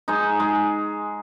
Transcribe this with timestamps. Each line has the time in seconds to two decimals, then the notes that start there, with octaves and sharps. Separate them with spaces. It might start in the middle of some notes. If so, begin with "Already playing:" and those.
0.08 G#3 D#4
0.40 G#3